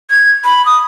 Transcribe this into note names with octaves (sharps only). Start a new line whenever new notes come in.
G#6
B5
D#6